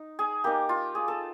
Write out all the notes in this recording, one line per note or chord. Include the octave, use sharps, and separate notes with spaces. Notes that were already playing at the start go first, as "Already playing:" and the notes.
Already playing: D#4
G#4
A#3 D#4 G4
F4
G#4
A4